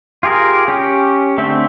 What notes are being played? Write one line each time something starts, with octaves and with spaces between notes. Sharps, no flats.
F4 G4 G#4 A#4
C#4 G4
D3 A3 C4 E5